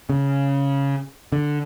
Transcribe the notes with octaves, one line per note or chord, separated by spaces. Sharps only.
C#3
D3